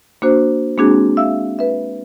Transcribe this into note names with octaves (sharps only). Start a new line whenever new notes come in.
A#3 D4 F#4 C5
G#3 A#3 C4 D4 F#4 G#4
E5 F5 E6
B4 E5